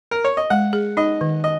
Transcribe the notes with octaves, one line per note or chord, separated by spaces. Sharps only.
A#4
C#5
D#5
G#3 F#5
G#4
D#4 D#5
D#3
D#5